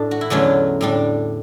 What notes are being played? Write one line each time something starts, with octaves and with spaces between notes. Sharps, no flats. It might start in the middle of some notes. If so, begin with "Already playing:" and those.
Already playing: A2 D4
F#4
E4
E2 D3 F#3 A3 C#4 D4
A2 G3 D4